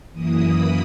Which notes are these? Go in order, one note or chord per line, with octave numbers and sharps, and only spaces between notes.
F#2 E3 A#3 E4 D#6
B5